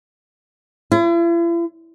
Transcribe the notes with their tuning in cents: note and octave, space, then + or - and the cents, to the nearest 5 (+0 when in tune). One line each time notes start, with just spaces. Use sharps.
E4 +45